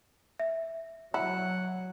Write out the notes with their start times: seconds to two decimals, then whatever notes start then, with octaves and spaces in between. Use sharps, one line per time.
0.40 E5
1.14 F#3 E4 F#5